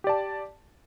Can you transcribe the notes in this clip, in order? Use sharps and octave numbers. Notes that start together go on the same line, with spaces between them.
G4 D5 A5